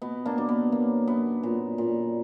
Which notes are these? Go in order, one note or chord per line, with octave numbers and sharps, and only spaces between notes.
B2 B3
A#3 D4
B2 D4
B3
F#3 A#3
F#2 B3
A#2
A#2